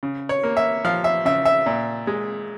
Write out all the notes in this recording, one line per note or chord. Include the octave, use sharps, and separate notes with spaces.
C#3
C#5
A#3
E5
F3 F5
E5
C#3 E5
E5
A#2
G#3